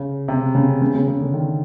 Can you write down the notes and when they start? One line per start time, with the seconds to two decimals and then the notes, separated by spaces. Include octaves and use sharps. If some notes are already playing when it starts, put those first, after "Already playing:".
Already playing: C#3
0.28 C3
0.55 C#3
0.82 C#3
0.95 C#3
1.08 C#3
1.21 D3
1.34 D#3